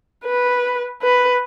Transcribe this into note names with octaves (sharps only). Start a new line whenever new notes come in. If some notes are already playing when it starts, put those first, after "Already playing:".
B4
B4